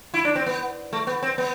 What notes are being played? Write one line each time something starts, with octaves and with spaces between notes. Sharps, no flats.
E4
D4
C4
B3
A3
B3
C4
B3